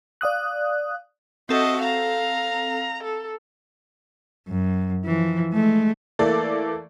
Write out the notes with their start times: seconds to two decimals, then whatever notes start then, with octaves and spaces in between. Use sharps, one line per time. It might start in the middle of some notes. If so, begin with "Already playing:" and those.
0.21 D5 F5 D#6 F#6
1.49 C4 F#4 A4 D#5 E5
1.83 F5 A#5
3.03 A4
4.48 F#2
5.05 E3 F3
5.53 G#3 A3
6.19 E3 A3 A#3 A4 D5